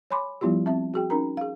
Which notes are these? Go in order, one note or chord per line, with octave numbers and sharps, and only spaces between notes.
C#5 G#5 B5 C6 D6
F3 G3 B3 E4 F4 G4
C4 E5 A5
F#4 G#4 G5
C#4 D#4 A#4 A#5
G#4 F5